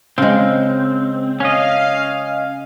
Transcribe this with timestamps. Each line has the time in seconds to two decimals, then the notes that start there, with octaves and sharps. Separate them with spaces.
0.18 C#3 G#3 C4
1.40 C#4 D#5 F5